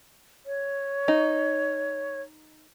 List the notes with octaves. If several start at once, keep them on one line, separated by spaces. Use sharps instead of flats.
C#5
D#4